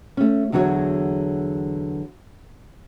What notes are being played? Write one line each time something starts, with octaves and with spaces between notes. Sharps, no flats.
A3 C#4
E2 D3 F#3 F#4 C#5